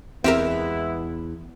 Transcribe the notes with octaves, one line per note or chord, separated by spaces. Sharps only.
E2 G#3 B3 C4 E4 G4 A#4 E5